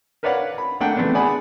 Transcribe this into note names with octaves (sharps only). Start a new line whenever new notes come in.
A#4 B4 C#5 D5 F5 F#5
B5
A3 A#3 D4 F#5 G5
E3 A3 B3 C4 D4
G#4 D5 F#5 G#5 B5